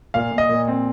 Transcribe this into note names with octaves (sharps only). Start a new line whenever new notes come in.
A#2 F5
A#2
D#5
A#2
C4